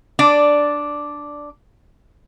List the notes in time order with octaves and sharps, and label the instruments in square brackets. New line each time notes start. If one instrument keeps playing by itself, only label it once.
[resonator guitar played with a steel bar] D4 D5